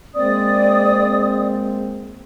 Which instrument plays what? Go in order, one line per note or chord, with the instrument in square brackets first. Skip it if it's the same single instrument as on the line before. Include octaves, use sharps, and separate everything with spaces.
[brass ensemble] G#3 A#3 C4 [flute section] D5 D#6